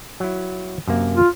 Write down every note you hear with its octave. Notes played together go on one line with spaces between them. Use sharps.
F#3 E4
F#2 C3 A#3
F4